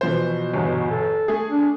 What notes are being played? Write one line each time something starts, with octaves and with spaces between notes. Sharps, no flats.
B2 E3 F3 C5
G1 E2
A4
A3 G#4
D4